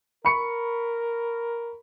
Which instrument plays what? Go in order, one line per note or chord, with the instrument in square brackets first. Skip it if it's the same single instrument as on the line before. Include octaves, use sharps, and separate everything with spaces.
[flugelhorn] A#4 [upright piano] B5 C#6 C#7